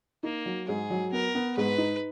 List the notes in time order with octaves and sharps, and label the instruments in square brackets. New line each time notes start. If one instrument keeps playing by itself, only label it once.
[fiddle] A#3 [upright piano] D#4
[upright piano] F#3
[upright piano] G#2 [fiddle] G#4
[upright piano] F#3
[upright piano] B3 [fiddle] A#4
[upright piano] B3
[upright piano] G#2 [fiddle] B4
[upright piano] D#4